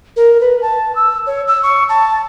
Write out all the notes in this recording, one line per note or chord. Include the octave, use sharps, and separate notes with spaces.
A#4
B4
A5
E6
C#5
E6
C#6
A5